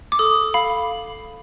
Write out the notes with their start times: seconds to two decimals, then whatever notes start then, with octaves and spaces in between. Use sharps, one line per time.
0.12 D6
0.19 A4 D#6
0.54 F5 B5